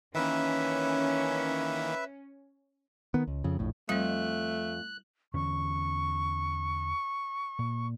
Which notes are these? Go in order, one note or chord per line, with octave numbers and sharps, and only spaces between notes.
D#3 E3 A#3 C#4 B4 E5
D#3 B3
C#2
F2 C#3
A#1 F2 A2
F2 G3 A3 D#5 F#6
E2 D3 C#4 C#6
A#2